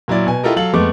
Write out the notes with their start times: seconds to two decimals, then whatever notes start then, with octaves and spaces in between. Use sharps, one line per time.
0.08 A#2 F#3 E4 D5
0.26 B2 G#5
0.43 E4 F4 G4 A4 A#4 D#5
0.56 F#3 A4 F5 F#7
0.74 F2 G#3 A3 B3 D6